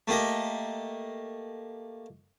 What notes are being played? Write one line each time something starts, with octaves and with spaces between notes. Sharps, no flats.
A3 A#3 G4 D#5